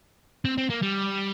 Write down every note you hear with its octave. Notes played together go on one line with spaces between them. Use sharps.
C4
C4
A#3
G3